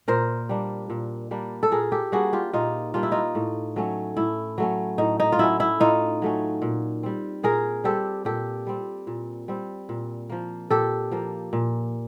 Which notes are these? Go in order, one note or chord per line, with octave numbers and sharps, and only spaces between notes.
A#2 A#4 C5
G3 A#3 D4
A#2
G3 A#3 D4
A4
A#2 G#4 A#4
G4 A4
G3 A#3 D4 F#4 G#4
F4 G4
A#2 D#4 F4
G3 A#3 D4 F4
E4
D#4 F4
A2
F#3 A3 C#4
A2 E4
F#3 A3 C#4
A2 D#4
D#4
F4
F#3 A3 C#4 E4
E4
A2 D#4 F4
F#3 A3 C#4
A#2
G3 C4
A#2 G#4 A#4
G3 C4 G4 A4
A#2 G4 A4
G3 C4
A#2
G3 C4
A#2
F3 A#3
A#2 G4 A4
F3 A#3
A#2